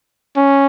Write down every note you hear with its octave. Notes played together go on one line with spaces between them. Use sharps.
C#4